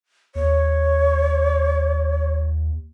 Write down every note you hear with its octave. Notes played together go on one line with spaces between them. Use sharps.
D#2 C#5